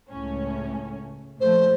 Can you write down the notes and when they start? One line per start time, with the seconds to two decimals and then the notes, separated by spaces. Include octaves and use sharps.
0.10 C#2 A2 C#4
1.41 A#2 F3 A3 C5